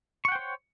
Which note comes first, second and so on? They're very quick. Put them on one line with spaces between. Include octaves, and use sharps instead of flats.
C#6 F#5 G5 C5 C#5